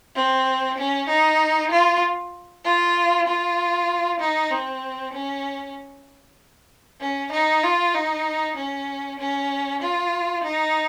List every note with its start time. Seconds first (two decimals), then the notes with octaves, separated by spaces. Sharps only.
0.15 C4
0.77 C#4
1.08 D#4
1.71 F4
2.64 F4
3.27 F4
4.20 D#4
4.51 C4
5.13 C#4
7.00 C#4
7.32 D#4
7.63 F4
7.94 D#4
8.56 C#4
9.19 C#4
9.81 F4
10.44 D#4